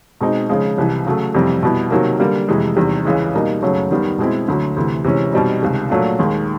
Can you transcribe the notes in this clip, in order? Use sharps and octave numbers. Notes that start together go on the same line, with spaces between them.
B2 G#3 C4 D#4
C#3 F3 G#3
C2 C3 E3
C#3 F#3 A3
F2 C3 E3 G3 C4
B2 G3 B3 E4
C3 D#3 F#3 A#3
D3 G3 A#3
F2 C3 E3 G#3
E2 C3 D#3 G3
C#2 C#3 E3 G#3
B2 G3 A#3 D#4
F#2 C#3 F#3 A3
D#2 D#3 G3 B3
B2 G#3 C4 E4
D2 D3 F#3
D2 C3 E3
C3 E3 G#3 C#4
B2 G3 C4 D#4
C#2 C3 D#3
A#2 F#3 A3 D4 F4
D#2 D#3 G#3